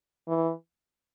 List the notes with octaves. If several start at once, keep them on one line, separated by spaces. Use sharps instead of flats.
E3